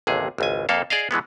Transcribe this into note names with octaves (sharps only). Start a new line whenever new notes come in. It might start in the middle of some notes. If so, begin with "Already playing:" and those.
A1 D#2 C3 G#4
G#1 C#2 G#5
F2 A#3 A4 F5
G#4 D5 D#5 F5
B2 E3 G#3 B3